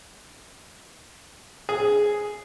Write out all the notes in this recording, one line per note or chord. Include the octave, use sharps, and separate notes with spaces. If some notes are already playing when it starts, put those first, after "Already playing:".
G#4